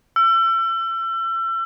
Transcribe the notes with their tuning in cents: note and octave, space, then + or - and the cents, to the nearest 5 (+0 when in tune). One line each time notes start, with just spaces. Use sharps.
E6 +35